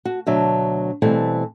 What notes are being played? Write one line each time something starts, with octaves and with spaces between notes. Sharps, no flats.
F#4
D2 B2 F#3 D4 E5
B2 E3 G3 A3 B3 C4